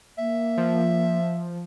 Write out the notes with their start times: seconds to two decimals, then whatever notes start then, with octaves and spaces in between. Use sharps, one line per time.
0.18 A#3 E5
0.57 F3